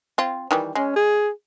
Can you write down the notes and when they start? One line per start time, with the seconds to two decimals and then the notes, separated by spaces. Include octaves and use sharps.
0.18 C4 F4
0.51 D#3 E3 G3
0.75 G#3 C#4
0.96 G#4